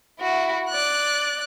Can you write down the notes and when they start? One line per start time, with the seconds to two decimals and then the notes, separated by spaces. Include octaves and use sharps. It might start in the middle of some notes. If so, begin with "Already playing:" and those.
0.20 E4 F#4
0.69 D5 F#6